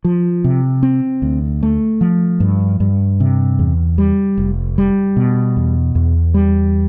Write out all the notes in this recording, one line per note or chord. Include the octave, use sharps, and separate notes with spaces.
F3
C3
C4
D2
A3
F3
G2
G2
C3
E2
G3
F1
G3
B2
E2
E2
G3